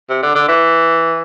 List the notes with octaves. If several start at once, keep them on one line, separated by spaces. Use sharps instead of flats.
C3
D3
D3
E3